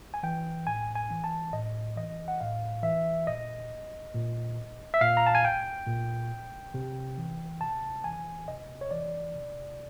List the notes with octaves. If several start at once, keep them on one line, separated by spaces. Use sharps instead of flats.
G#5
E3 G5
A2 G#5
G#5
E3
A5
A2 D#5
E3 D#5
F#5
A2 F5
E3 E5
A#2 D#5
A#2
E5
A#2 F5
A#5
A5
G#5
G5
A#2
C3
E3
C3 A5
E3 G#5
C3 D#5
C#5
E3 D5
C3